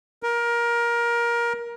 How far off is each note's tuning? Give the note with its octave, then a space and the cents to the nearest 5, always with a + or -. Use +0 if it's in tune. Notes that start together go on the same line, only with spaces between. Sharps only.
A#4 +20